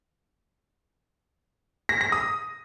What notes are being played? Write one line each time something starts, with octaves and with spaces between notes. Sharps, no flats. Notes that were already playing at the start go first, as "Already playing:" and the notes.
A#6
A#6
D#6